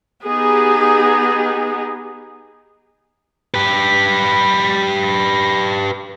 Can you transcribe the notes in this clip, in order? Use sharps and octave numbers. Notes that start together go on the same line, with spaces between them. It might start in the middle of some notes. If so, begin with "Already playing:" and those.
B3 D#4 G4 G#4
G4 B4